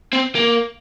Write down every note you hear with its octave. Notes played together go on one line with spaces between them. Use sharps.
C4
A#3